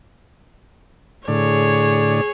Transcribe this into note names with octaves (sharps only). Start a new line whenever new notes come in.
A2 D3 G#4 C#5 D5